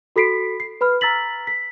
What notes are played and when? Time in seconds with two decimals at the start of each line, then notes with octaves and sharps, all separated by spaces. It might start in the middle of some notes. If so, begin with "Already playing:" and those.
0.16 F#4 A4 B5 B6 C7 D7
0.60 C7
0.81 B4 B5 F6
1.01 A#5 E6 A6 B6 F#7
1.47 B6